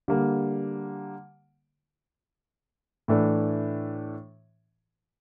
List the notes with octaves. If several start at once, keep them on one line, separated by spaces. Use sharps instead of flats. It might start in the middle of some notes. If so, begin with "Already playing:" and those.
D3 G3 A#3
A2 E3 A3 D4